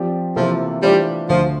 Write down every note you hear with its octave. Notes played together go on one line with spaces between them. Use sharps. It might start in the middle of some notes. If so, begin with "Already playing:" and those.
Already playing: F3 C4 G4 D5
C3 E3 F3 A#3 F4 A4
E3 G3 A3 D4 F4 C5
D2 D3 F3 A3